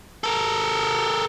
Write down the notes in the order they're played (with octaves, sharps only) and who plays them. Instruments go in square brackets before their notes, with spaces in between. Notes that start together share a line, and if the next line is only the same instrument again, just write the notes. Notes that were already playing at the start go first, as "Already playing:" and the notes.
[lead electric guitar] A4 A#4